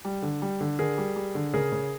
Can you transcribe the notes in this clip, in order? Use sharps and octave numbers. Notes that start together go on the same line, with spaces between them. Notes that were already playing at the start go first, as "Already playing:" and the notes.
G3
D3
G3
D3
D3 G#4 A#4
G3
G3
D3
C#3 G#4 A#4
C#3